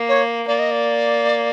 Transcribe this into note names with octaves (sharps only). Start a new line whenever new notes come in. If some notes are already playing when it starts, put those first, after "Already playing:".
Already playing: A#3
C#5
A#3 D5
D#5
D5